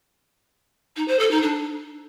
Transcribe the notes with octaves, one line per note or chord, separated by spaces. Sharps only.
D#4
C5
A4
D#4
D4